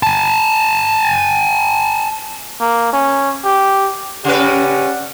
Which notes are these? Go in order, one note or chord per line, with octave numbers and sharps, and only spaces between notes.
G#5 A5
A#3
C#4
G4
C#3 C#4 G4 B4 D5 F#5